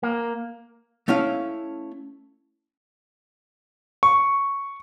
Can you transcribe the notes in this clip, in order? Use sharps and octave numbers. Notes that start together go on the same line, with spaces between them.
A#3
A3 C#4 E4 F5
C#6